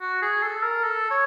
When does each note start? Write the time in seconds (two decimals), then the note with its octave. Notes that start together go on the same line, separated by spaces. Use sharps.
0.01 F#4
0.22 G#4
0.43 A4
0.62 A#4
0.83 A4
1.11 C#5